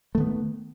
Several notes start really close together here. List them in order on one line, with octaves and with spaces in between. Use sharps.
A3 D#3 B3